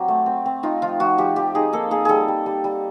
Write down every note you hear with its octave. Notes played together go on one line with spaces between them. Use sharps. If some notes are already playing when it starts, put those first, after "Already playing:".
Already playing: F#3 C4 G4
A3
C4
C4
D#4 F4
F3 F4
F3 F#4
F3 G4
F3 G4
D#4 G#4
A#3 A4
A#3 G#4
G3 G#4 A4
G3
G3
G3